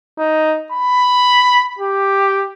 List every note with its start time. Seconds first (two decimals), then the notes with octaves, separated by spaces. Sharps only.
0.19 D#4
0.72 B5
1.79 G4